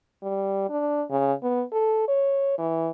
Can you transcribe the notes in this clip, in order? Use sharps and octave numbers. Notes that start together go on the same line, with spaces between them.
G3
D4
C#3
B3
A4
C#5
E3